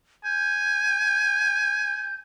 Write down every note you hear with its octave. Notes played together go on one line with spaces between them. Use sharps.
G#5 G6